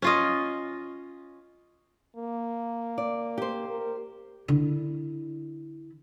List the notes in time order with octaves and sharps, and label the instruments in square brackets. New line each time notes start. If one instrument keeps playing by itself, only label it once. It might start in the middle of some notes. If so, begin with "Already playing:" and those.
[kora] C#4 F4 D#5
[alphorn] A#3
[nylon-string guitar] D5
G4 C5
[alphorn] A#4
[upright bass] D3 E4